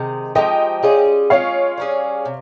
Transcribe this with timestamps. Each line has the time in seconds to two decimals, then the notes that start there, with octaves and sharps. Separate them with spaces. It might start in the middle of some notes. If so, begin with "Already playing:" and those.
Already playing: C3 D#3 G#3
0.35 F3 G#3 D#4 G4 D#5 G5
0.83 G3 C#4 F4 G#4
1.30 G#3 C#4 F4 C#5 F5
1.77 G3 A#3 C#4 G#4
2.25 C3